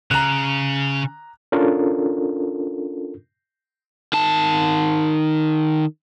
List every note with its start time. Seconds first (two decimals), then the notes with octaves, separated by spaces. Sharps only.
0.11 C#3 A#5 F#6
1.52 C#4 D4 F4 A4 A#4
4.13 D#3 A5